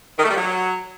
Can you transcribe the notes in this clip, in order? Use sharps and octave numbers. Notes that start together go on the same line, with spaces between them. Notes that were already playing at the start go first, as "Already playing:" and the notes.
D#3
A3
G3
F#3